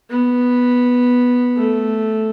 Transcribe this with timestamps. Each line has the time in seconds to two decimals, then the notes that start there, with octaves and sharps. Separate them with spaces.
0.10 B3
1.57 A3